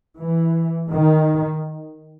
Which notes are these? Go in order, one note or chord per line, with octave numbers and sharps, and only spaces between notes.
E3
D#3